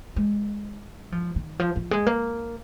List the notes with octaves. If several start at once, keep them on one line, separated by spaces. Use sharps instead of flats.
G#3
F3
D#3
F3
F3
G#3
A#3